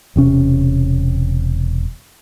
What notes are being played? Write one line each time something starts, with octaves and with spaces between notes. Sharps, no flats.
E1 C3 C#4